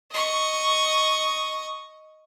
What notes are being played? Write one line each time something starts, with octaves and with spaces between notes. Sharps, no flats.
D#5 C#6